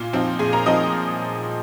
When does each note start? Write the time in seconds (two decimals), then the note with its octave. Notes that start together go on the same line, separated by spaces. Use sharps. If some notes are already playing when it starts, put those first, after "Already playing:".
Already playing: A#2 F4
0.13 F3 C4 D#4
0.39 A#2 G#4 G#5
0.53 A#4 A#5
0.66 F3 C4 D#4 D#5 D#6